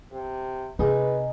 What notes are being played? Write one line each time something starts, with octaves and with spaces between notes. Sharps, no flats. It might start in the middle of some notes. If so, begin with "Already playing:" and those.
C3
C3 D#4 G#4 B4